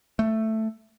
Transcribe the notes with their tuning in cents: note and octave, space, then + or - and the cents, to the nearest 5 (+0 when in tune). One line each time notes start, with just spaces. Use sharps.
A3 +5